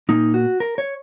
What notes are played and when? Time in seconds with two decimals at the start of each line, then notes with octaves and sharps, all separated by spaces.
0.09 A#2 A#3 D#4
0.34 F#4
0.60 A#4
0.78 C#5